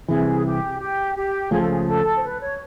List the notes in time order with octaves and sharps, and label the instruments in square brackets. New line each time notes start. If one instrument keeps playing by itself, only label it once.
[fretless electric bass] C2 C3 E3 [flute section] G#4
[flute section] G4
G4
G4
[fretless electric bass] C#2 C#3 F3 A3 [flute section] G#4
[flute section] A4
G#4
G#4
A4
C5
B4
C#5